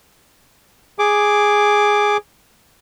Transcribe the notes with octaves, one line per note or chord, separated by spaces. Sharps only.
G#4 D6